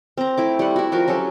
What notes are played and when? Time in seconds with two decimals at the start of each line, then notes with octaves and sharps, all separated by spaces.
0.17 C4 A#5
0.37 A3 E4 D6
0.59 G3 F#5
0.76 E4 F#4
0.92 F3 F#4 A#4
1.08 F#3 C#4 G4 A4